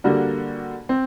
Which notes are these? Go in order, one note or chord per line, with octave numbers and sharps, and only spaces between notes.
D3 G3 A#3 D4 F#4
C4